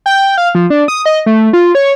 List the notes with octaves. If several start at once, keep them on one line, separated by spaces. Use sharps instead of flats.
G5
F5
F3
D4
D#6
D#5
A3
F4
C#5